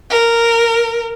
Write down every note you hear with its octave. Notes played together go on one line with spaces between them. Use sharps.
A#4